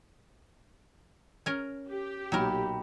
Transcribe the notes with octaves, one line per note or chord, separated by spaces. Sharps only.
C#4 A#4
G4
B1 A#2 F#3 A#4 G5 A#5 B5